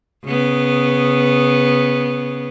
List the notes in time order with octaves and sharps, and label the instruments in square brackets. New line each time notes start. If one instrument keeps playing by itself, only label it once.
[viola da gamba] C#3 B3